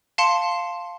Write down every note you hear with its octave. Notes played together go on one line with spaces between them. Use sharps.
F5 A5 C6 C#7